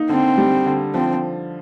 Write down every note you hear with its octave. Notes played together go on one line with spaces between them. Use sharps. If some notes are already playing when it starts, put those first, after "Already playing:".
Already playing: A#3 D#4
D3 C4
G3
D3
F3 C4